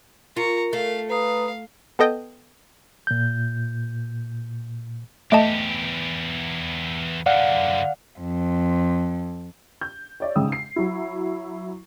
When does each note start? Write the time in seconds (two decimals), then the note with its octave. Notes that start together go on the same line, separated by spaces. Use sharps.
0.37 F4 A#4 A#5 C#6
0.73 A3 F5
1.10 B4 F5 A#5 D#6
1.99 B3 A4 D#5 G5
3.07 A#2 G6
5.32 E2 A3 G4 D#5 A5
7.26 F#2 D3 D5 F5 F#5
8.20 F2
9.81 G6
10.20 C#5 D5 E5
10.36 G#2 C#3 G#3 G5 D#6 E6
10.52 C7
10.76 F#3 E4